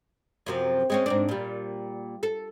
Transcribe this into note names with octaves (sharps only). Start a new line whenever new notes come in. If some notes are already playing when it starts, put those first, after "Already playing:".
F#2 C3 F3
G#3 C4 C#4
G#2 C4 D4
A#2 G3
A4